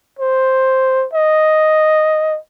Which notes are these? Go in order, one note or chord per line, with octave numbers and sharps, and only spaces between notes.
C5
D#5